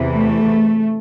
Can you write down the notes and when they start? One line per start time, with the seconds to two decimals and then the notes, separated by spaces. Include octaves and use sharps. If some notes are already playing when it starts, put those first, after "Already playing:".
Already playing: E2 C3 E3
0.13 A3